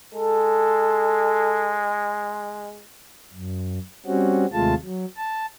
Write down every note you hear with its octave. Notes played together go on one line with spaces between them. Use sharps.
G#3 A4
F#2
G3 C4 C#4 F#4
D#2 C3 G#3 A3 F4 A5
F#3
A5